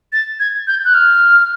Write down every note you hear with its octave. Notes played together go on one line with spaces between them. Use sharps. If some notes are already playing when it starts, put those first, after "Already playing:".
A6
G#6
G6
F#6
F6